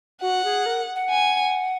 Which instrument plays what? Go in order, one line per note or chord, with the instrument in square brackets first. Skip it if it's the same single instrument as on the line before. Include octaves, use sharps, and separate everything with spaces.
[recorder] F#4 [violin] F#5
[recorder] G#4
A#4
F#5
[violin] G#5